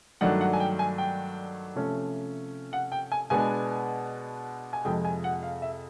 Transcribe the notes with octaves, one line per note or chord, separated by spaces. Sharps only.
G2 D#3 F#3 A3 D4 F#5
F#5
G#5
G5
G#5
G5
C3 F3 A3 C#4
F#5
G5
G#5
B2 G#3 B3 D4 G#5
G#5
F2 C3 F3 G#3 G5
G#5
F#5
F5
E5